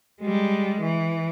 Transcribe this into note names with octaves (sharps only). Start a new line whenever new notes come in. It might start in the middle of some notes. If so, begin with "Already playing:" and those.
G3 G#3
E3